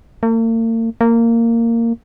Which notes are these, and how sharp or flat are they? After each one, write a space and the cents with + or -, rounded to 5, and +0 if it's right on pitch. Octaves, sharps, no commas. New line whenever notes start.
A#3 -45
A#3 -15